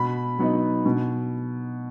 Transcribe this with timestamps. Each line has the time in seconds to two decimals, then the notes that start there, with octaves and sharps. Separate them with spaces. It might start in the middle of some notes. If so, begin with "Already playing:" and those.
Already playing: B2 B5
0.39 F#3 B3 D#4
0.86 B2